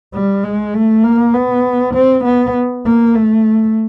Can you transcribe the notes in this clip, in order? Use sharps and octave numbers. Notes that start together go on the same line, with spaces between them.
G3
G#3
A3
A#3
B3
C4
B3
A#3
A3